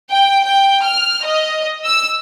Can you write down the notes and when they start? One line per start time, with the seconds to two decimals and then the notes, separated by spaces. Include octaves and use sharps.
0.12 G5
0.46 G5
0.84 F6
1.25 D#5
1.85 E6